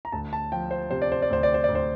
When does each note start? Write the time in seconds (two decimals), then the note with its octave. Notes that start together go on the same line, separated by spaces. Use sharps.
0.05 A#5
0.12 D2 A5
0.33 A5
0.52 F3 G5
0.71 C5
0.91 C3 C5
1.02 D5
1.12 C5
1.22 D5
1.30 D2 C5
1.43 D5
1.54 C5
1.64 D2 D5
1.75 C5